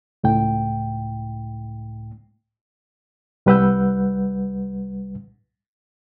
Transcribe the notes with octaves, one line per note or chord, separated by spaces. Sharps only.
C#2 A2 G5
C2 G3 B4 F#5 E6 G6